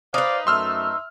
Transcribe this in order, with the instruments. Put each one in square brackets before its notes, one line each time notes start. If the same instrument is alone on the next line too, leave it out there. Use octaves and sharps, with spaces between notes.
[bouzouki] D#4 B4 [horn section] C5 D5 F5 [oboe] D6
[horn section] F#2 A3 [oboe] E5 [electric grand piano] C6 E6 F6